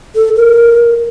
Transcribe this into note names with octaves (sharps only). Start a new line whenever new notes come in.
A4
A#4